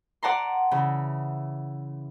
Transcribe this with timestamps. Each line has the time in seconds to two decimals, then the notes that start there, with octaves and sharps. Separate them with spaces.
0.23 D5 F#5 A5 A#5 C6
0.71 C#3 E3